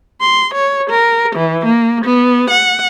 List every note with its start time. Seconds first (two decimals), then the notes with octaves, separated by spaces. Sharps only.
0.21 C6
0.54 C#5
0.90 A#4
1.36 E3
1.65 A#3
2.05 B3
2.50 F#5